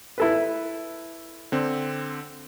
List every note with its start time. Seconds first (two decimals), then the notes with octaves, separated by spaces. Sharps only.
0.18 E4 A4 B4
1.52 D3 C4